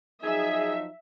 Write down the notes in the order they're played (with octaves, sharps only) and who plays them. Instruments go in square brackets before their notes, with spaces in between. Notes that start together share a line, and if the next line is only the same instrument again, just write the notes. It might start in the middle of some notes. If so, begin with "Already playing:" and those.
[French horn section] F3 F#3 D#4 [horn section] G#4 [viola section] E5